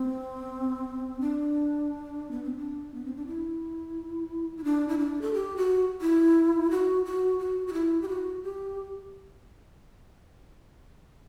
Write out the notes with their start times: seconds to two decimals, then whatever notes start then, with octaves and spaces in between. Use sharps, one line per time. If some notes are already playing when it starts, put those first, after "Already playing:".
Already playing: C4
1.21 D4
2.31 B3
2.44 C4
2.58 D4
2.94 B3
3.05 C4
3.16 D4
3.27 E4
4.58 E4
4.64 D4
4.88 E4
4.99 D4
5.22 A4
5.34 G4
5.57 F#4
6.01 E4
6.71 F#4
7.05 F#4
7.39 F#4
7.67 F#4
7.73 E4
8.02 G4
8.09 F#4
8.43 G4